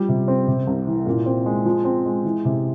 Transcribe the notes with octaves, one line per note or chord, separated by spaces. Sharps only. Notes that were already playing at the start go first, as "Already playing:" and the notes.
Already playing: F3 G3
C3
C4
C3
C2
E3
A#2
C4
G#3
F3
C4
G#3
E3
C3